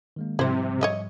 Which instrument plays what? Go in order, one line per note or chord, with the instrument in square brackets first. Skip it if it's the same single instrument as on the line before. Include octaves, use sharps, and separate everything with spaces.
[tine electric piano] D#3 G#3 A#3
[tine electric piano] G#2 F3 G3 [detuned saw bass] C3 [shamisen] E4 C5
[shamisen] C#5 D#5 E5